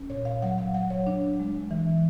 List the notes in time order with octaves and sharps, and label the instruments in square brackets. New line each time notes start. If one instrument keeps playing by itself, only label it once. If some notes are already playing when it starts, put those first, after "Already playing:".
Already playing: [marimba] C#4
A#2 C#5
F5
F#3 F#5
F5
F#3 F#5
C#5
D4
G#3
E3